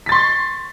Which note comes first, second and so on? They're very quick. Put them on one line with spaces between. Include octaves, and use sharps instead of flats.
B6 A6 C6 C#6